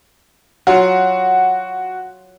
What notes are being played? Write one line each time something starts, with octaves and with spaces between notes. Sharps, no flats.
F#3 F4 F#4